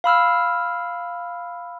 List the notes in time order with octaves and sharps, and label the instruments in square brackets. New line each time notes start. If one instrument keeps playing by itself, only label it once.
[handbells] F5 B5 E6 F6